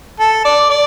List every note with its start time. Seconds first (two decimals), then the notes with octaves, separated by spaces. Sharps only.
0.20 A4
0.45 D5
0.70 D5